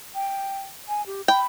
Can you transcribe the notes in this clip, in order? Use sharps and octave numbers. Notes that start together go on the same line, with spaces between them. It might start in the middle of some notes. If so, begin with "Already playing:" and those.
G5
G#5
G4
G5 B5